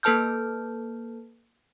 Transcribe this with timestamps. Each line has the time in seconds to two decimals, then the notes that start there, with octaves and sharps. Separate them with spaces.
0.03 A#3 A4 B4 A5 F6 G6